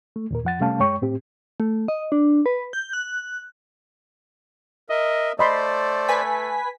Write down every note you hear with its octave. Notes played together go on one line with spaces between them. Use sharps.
A3
D#2 A#2 A#4
F2 F3 F#5 A6
C3 G3 A3 C#4 F5 A5
F#2 G#3 C#5 G5 C#6
A2 C4 G4
A3
D#5
D4
B4
G6
F#6
A#4 D#5 E5
A3 C5 D5 D#5 B5 C6
B4 G#5 B6